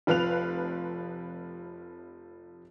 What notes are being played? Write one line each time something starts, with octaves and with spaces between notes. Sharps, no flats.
F1 F3 B4 F5 F#6 F7